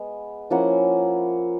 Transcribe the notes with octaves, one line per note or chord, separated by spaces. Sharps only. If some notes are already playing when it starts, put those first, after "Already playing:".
Already playing: G#3 B3
F3 A#3 C#4 E4 F#5